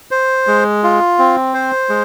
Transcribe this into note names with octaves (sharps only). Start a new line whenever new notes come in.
C5
G#3
F4
C4
C5
G#3